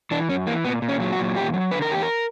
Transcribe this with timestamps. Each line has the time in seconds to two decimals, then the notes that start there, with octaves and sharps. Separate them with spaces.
0.11 E3 D4
0.29 F#2 C#4
0.47 E3 A#3
0.65 A#2 B3
0.82 A#2
0.89 C#4
1.00 F#3
1.12 F#4
1.19 A#2
1.36 E2 G4
1.54 F#3
1.71 D3 B4
1.82 A#4
1.89 E2 G4
2.02 A#4